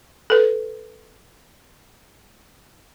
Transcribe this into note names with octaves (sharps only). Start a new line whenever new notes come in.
A4 B4